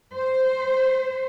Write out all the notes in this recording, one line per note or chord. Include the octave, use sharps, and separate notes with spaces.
C5